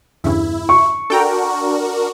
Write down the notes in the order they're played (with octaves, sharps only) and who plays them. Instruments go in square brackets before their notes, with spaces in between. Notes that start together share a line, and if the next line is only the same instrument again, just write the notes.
[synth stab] E2 G2 C#3 [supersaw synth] E4
[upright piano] C#6
[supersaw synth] D4 F#4 A#4 [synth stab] A4 G5 A#5